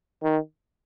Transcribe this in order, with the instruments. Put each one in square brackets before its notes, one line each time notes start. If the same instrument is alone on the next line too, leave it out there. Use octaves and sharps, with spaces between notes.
[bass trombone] D#3